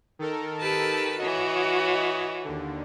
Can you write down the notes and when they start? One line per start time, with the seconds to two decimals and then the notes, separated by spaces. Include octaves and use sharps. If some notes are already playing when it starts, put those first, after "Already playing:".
0.19 D#3 A4 A#4
0.61 G4 B4 A5
1.18 E3 F#4 C#5 D#5
2.45 D#2 D3